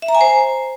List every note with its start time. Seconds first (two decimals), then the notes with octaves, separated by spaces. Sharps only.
0.02 E5
0.08 A#5
0.15 G#5
0.21 C5